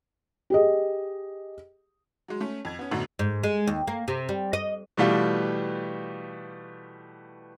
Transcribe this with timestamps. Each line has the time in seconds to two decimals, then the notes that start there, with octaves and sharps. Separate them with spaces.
0.50 G4 G#4 D#5
2.28 F#3 G#3
2.41 A3 C#4
2.65 F2 G#6
2.79 B3 C#4
2.91 A1 F#2 B2 D3 A3
3.19 G#2
3.43 G#3
3.67 D#2
3.87 A#3
4.08 C3
4.29 G3
4.53 D#5
4.97 B2 E3 G3 A3 F4 G4